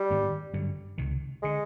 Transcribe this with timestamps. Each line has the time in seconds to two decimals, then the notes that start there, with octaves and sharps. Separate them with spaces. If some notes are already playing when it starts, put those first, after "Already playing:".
Already playing: G3
0.11 G#2 D#3 G#3 B3
0.53 G2 D3 F#3
0.98 C#2 C3 D#3
1.42 D3 G#3